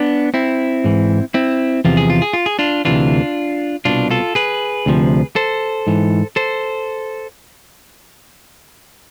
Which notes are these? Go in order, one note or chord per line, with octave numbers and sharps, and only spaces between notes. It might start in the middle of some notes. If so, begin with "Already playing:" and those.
Already playing: B3 D4
C4 E4
G#2 E3
C4 E4
E2 C3 F3 F4
G#4
F4
G#4
F4
G#4
D4 F4
D2 C3 E3 D4 F4
C2 B2 D4 F4
F4 A4
G#4 B4
D2 C3 F3
A4 C5
G#2 E3
A4 C5